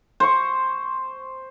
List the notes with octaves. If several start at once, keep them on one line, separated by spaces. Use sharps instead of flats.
C5 C#6